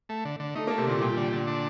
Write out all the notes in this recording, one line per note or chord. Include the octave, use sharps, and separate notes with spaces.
A3
D3
D3
A3 D#4
A#3
A3
C3
A#2 D3
A#2 G3
D3
D3
D4